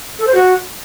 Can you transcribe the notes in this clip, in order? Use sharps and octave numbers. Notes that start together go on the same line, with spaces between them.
A4
C5
F#4